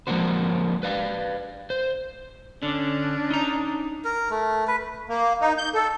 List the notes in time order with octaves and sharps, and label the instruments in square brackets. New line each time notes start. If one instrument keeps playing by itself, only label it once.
[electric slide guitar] F3 G#3 A#3 D4 F#4 C5
B4 D5 F5
C5
[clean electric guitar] D3 [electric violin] C#4 D4
[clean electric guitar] D#4 A#5
[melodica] A#4
A3
B4
[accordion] A#3
D#4
G6
A4